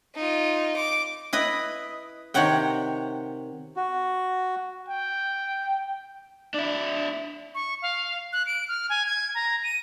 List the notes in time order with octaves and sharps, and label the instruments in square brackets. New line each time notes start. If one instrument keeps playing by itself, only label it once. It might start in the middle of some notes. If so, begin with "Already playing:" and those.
[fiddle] D#4 F4
D6
[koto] E4 B4 D#5
C3 D#3 C#5 F#5 G5
[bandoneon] F#4
[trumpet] G5
[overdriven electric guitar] D4 E4
[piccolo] C#6
F5
F#6
D7
F6
G#5
G#6
A#5
D#7